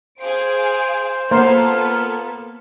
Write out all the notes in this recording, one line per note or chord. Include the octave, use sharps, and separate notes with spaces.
G#4 C5 F5 D7
A#3 B3 F4 A4 C5